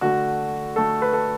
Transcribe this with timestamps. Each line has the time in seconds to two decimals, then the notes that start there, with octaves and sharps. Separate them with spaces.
0.01 D3 A3 F#4
0.76 D3 A3 A4
1.02 B4
1.13 A4